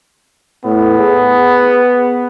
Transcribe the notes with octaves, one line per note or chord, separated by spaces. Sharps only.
A2 B3
G#4